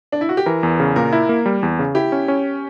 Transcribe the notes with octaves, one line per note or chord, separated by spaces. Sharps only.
D4
E4
F#4
G4
E3 A#4
E2
C#3
A#2 A#4
E4
A#3
G3
E2
C#3
E4 G4
C#4
C#4